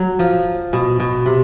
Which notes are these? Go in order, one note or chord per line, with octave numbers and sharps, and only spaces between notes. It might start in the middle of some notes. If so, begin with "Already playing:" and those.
Already playing: F#3
F3
B2
B2
C3